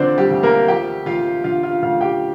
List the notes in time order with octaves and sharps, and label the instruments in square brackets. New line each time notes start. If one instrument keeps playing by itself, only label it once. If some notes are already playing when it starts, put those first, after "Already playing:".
Already playing: [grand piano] D2 D3 C4 D4 F4 C5 D5
G3 G4
D2
A#3 A#4
F3 G4 G5
D2 F4 F5
D3 F4 F5
F4 F5
D2 F4 F5
G4 G5